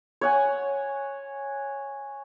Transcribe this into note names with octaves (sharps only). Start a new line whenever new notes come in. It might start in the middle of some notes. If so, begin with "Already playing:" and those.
C#5 F#5 G#5